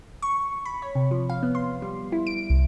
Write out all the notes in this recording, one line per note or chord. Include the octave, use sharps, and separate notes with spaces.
C#6
B5
C#5
C3
F3
F5
B3
C6
G3
E4
D7
C2